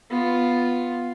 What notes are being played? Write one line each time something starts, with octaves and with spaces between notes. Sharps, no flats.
B3 F4